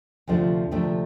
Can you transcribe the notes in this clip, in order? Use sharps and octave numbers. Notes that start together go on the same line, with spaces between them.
D2 C3 F3 A3 D4
D2 C3 F3 A3 D4